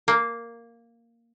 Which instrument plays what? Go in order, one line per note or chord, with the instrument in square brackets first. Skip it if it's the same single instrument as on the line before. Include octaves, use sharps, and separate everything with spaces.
[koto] A#3